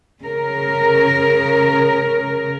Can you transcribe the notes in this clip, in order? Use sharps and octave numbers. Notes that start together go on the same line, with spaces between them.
C#3 A#4